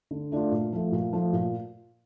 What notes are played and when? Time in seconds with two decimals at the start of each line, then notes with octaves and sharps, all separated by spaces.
0.11 D3
0.32 A3 D4 F4
0.51 A#2
0.73 F3 A3
0.92 A#2
1.13 F3 A3
1.33 A#2